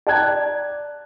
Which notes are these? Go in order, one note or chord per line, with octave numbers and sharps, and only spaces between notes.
D5 G5 A5 A#5 F#6 G#6